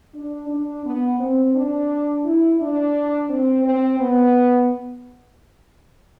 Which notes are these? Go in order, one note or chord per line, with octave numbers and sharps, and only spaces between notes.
D4
D4
B3
C4
D4
E4
D4
C4
C4
B3